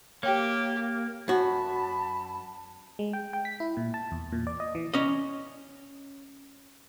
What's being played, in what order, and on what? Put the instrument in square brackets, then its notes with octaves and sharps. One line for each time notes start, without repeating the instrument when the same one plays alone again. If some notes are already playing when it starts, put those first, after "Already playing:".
[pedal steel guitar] A#3 [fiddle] G4 [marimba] C#5 G5
[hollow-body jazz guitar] F#2 F#4 [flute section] A5 B5
[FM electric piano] G#3
G5
G5
B6
E4
A#2
A5
E2
A#2
D5
D#5
E3
[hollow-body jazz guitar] C#4 D#5